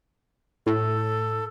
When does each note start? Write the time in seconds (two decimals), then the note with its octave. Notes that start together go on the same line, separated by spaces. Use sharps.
0.66 A2 A4